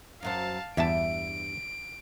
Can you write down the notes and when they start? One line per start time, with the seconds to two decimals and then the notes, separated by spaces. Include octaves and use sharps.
0.23 F#2 F#3 C5 F5 A5
0.77 E2 G2 G4 E5 A5 D7